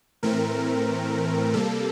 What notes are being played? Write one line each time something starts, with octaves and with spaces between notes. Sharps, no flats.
A2 E3 A3 C4 A#4
C3 G3 A#3 A4